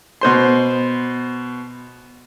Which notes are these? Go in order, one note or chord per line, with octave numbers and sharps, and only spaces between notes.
B2 C5 C6